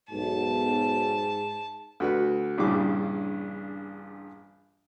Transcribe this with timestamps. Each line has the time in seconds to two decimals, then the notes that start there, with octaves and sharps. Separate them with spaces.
0.11 B1 G#2 A5
2.00 D2 F#4 B4
2.58 A#1 G2 C#3 E3 G3 D6